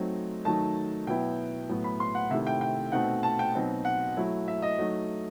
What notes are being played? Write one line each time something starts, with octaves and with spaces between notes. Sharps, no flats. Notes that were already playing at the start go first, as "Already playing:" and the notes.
Already playing: F#3 A3 C4 D#4
D#3 F#3 A3 D#4 A5
B2 F#3 B3 E4 G5
A2 F#3 B3
B5
C6
F#5
C3 D#3 A3 E4 E5
G5
G5
B2 A3 C4 D#4 F#5
A5
G5
B2 F#3 C4 D#4
F#5
F#3 A3 E4
E5
D#5
F#3 A3 D#4